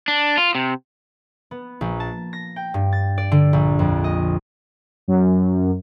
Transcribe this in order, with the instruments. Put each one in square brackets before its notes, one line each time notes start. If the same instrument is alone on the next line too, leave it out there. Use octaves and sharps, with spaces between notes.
[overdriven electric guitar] D4
F4
C3
[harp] B3
A#1
A5
A#6
G5
G2
A6
D5
D3
A#1
F2
D#5
[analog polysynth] F#2